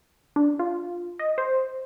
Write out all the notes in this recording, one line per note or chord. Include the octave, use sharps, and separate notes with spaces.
D4
F4
D#5
C5